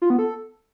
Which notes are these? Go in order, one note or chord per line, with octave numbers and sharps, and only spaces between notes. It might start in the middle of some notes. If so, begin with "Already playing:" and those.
F4
B3
A4